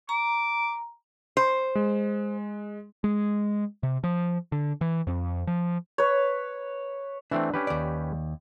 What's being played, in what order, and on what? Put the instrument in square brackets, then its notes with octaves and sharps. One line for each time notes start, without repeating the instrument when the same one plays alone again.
[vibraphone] A#5 [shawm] D6
[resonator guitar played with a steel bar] C5
[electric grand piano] G#3
[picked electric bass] G#3
C3
F3
D3
E3
F2
F3
[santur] B4 C#5
[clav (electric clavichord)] E3 A3 C4 [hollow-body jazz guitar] D4
[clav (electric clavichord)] C#4 G4 B4
[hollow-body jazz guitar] D#2 D5